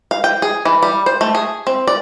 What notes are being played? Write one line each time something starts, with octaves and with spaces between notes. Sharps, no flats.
F5
G5
G#4
E3
G3
C5
A3
G#4
C4
D5